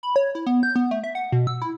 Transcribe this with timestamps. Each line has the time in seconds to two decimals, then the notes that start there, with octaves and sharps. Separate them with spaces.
0.03 B5
0.16 C#5
0.35 E4
0.46 B3
0.63 G6
0.76 B3
0.91 A3
1.04 E5
1.15 F#5
1.32 B2
1.47 E6
1.62 E4